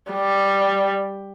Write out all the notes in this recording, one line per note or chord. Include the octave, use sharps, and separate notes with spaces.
G3